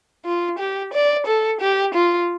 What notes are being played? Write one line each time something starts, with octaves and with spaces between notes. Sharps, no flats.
F4
G4
D5
A4
G4
F4